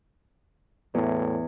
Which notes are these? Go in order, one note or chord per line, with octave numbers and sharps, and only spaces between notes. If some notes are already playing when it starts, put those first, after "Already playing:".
E2 A2